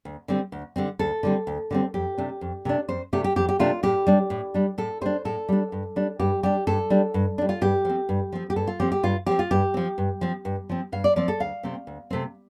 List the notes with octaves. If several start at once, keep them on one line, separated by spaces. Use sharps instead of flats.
D2
D3 G3 C4
D2
D3 G3 C4
D2 A4
D3 G3 C4
D2
D3 G3 C4
F2 G4
C3 A3 D4
F2
C3 A3 D4
F2 C5
C3 A3 D4 G4
G4
F2 G4
G4
C3 A3 D4 F4
A2 G4
G3 D4
A2
G3 D4
A2 A4
G3 D4 C5
A2 A4
G3 D4
G2
G3 D4
G2 G4
G3 D4 G4
G2 A4
G3 D4
G2
G3 D4
F4
G2 G4
F3 C4
G2
F3 C4
G4
G2 A4
F4
F3 C4 G4
G4
G2 F4
F3 C4 G4
F4
G2 G4
F3 C4
G2
F3 C4
G2
F3 C4
G2 F5
D5
F3 C4 D5
A4
D2 F5
C3 A3 C4
D2
C3 A3 C4